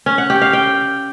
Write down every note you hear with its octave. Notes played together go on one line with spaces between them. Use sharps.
C#4
F#5
G4
F5
G5